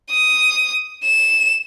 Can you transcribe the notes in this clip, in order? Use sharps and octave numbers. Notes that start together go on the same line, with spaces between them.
D#6
E7